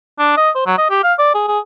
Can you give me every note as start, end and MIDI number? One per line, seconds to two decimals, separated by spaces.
0.19 0.35 62
0.37 0.50 75
0.55 0.64 72
0.66 0.74 54
0.78 0.90 75
0.90 1.03 67
1.04 1.14 77
1.19 1.32 74
1.35 1.44 68
1.48 1.59 68